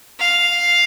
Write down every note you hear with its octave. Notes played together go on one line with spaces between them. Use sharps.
F5